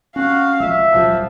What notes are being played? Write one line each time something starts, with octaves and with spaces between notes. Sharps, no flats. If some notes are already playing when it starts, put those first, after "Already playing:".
C#4 F#4 F5
C2 F3 G#3 E5
D#1 C2 F3 F#3